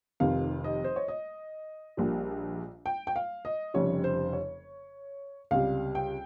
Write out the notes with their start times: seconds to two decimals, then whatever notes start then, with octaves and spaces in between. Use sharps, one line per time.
0.20 F1 F2 C3 D#3 F5
0.64 D#5
0.84 C5
0.96 C#5
1.08 D#5
1.97 A#1 A#2 G3
2.86 G5
3.07 G5
3.16 F5
3.45 D#5
3.74 F1 F2 C#3 G3 C#5
4.04 C5
4.33 C#5
5.51 C#2 C3 G3 F5
5.95 G5